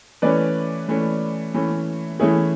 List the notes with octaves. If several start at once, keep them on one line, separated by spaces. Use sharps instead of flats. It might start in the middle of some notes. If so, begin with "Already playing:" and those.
E3 A3 C#4 B4 D5
E3 A3 C#4
E3 A3 C#4
E3 A3 C#4 E4 G#4